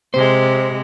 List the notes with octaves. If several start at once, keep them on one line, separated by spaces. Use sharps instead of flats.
C3 G#3 C5